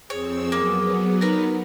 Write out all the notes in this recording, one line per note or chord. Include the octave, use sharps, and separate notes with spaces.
F2 C4 G#4 C#5 E6
F#3 A#3 B3
D#4 A#4 B4